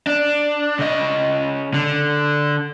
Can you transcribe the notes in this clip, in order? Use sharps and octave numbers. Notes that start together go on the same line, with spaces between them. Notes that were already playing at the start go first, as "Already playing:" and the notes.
D4
C#3 D#5
D3